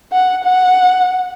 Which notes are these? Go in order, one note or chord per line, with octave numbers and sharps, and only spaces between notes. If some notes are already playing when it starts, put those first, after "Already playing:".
F#5
F#5